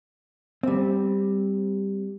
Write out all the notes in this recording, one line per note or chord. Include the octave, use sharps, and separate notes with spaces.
G3 C4